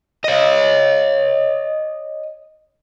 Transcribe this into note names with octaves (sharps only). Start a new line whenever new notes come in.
C#5 D#5